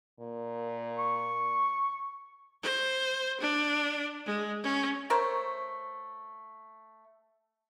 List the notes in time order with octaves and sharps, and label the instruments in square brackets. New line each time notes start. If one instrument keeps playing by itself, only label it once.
[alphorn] A#2
[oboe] C#6
[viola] C5
D4
G#3
C#4
[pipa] A3 A#4 C5 C#5